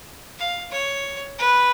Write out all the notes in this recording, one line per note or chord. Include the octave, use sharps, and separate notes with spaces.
F5
C#5
B4